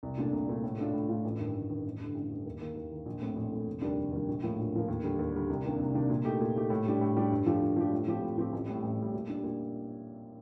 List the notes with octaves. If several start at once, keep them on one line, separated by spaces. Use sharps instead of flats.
C2
A#2 A3 D4
C2
A#2 A3 D4
A2
A3 D4 F4
A2
A3 D4 F4
A1
G2 D#3
A1
G2 D#3
A1
G2 D3
A1
G2 D3
D#2
D#3 A#3
D#2
D#3 A#3
A#1
A2 A3 C4
A#1
A2 A3 C4
F1
D#2 D#3 G3 D4
F1
D#2 D#3 G3 D4
A#1
A2 F3 A#3
A#1
A2 F3 A#3
D#2
D3 G3
D#2
D3 G3
C2
C3 D#3 A#3 D4
C2
C3 D#3 A#3 D4
A#2
A3 D#4 G4
A#2
A3 D#4 G4
A2
G3 D4 G4
A2
G3 D4 G4
G2
F3 A3 D4 G4
G2
F3 A3 D4 G4
A2
F3 C4 G4
A2
F3 C4 G4
A1
A2 G3
A1
A2 G3
A#2
G3 D4
A#2